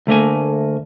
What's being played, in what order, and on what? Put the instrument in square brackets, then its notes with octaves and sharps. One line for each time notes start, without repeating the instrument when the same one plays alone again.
[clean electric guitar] D2 A3 A#3 G#5